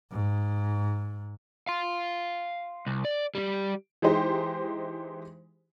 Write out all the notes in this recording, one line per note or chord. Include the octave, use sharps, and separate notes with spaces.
G#2
F5 C6
C2
D5
G3 G4
E3 G#3 D#4 G4 C5